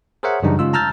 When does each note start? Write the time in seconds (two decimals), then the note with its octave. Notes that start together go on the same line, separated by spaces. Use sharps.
0.23 G#4 A#4 C5 C#5 E5 F#5
0.43 F#2 C#3 E3 G3 D4 D#4
0.59 C#3 G#3 F4 E6
0.73 A5 A#5 E6 F6 G6 A6